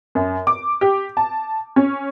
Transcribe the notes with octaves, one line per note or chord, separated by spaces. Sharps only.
F#2
D6
G4
A5
C#4